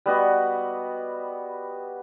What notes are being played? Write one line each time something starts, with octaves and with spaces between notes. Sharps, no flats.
G3 B3 F#4 D#5